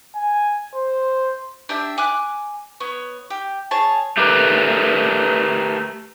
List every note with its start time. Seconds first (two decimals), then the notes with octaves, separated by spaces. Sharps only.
0.15 G#5
0.75 C5
1.69 D4 G4 E5
1.98 G#5 D6 F#6
2.80 B3 C#5
3.30 G4
3.71 G#4 C#5 A5
4.17 A3 G4 A#4 B4